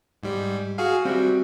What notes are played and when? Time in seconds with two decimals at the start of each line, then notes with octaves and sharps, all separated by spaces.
0.23 G#2 G3
0.78 F#4 G#4 F5
1.05 G3 C4 F#4 E5